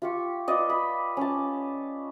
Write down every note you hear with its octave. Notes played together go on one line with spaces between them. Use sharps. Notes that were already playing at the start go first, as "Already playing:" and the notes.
F4 G4 C#6
F4 B4 D5 D#5
B5
C#4 A5